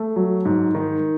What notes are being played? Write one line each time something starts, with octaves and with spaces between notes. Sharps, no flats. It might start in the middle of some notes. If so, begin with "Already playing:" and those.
Already playing: A3
F#3
G#2
D#3